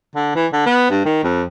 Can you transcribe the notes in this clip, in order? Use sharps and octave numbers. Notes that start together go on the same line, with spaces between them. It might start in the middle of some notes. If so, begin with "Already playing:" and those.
D3
E3
D3
B3
G2
D#3
F2